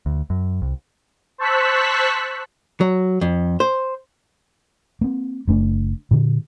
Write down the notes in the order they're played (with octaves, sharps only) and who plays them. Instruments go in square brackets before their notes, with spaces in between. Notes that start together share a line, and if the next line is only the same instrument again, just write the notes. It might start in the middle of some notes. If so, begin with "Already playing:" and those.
[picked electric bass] D2
F#2
C2
[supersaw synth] C5 A5 C#6 E6 F#6 B6
[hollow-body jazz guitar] F#3
F2
C5
[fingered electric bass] A#3 C4
F#1 A3 D4
A#2 D3